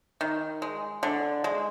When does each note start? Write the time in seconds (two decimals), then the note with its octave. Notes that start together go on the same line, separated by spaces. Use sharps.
0.21 D#3
0.62 G#3
1.03 D3
1.44 G#3